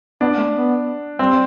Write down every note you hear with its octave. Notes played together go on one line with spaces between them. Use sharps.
B3 D4
A3
B3
G3 C4